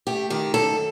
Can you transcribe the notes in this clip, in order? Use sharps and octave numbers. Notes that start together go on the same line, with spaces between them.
A3 G4
D#3 G4
F#2 A4